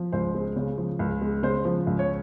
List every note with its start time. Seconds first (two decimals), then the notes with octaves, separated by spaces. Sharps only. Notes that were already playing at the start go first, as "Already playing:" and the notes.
Already playing: F3
0.12 C#2 C5
0.35 G#3
0.56 C#3
0.78 F3
0.99 C#2
1.21 G#3
1.43 C#3 C5
1.65 F3
1.87 C#2
1.99 C#5